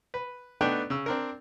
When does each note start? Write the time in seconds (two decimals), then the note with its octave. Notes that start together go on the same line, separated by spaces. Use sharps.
0.14 B4
0.61 A3 B3 D4 D#4 G5 F#6
0.90 C#3 E6
1.06 C4 D4 A#4